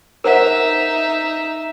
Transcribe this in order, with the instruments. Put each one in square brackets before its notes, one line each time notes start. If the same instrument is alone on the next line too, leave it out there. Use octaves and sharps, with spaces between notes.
[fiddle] D#4 E5 [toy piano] A#4 C5 F#5